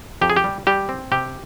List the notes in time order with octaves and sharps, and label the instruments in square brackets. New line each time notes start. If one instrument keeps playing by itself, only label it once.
[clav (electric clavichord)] F2 G4
G#4
G4
G3
G3 G4
C4
C3 G4